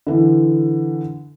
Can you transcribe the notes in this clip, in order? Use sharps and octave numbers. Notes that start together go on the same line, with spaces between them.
D3 E3